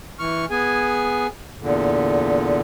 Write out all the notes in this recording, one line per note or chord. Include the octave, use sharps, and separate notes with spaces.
E3 C#6 F6
B3 G#4 G#5
E2 A#2 D3